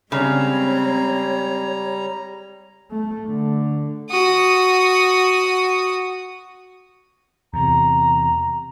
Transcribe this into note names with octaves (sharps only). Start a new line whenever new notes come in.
C#3 G3 G#3 C4 C#5 A#5
A3
D3
F#4 D#6
E2 C3 A#5